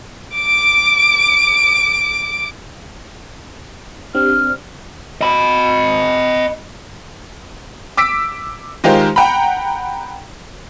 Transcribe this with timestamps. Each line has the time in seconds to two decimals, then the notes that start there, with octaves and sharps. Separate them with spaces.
0.37 D6 D7
4.15 C4 D4 G4 F6
5.21 D#5 B5
7.97 D6 E6 B6 D7
8.84 D#3 G#3 F4 G4 A#4 C5
9.16 F#5 G5 A#5 B5